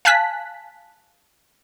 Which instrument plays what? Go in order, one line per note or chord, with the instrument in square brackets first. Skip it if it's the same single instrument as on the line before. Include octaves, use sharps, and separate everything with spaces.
[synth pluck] F5 G#5 A5 F#6 B6